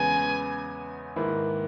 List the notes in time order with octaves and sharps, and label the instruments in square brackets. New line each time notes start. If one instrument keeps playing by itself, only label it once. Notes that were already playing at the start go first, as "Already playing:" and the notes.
Already playing: [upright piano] E2 C#3 G#3 B3 [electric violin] G#5
[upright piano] G#2 D#3 A#3 E4 B4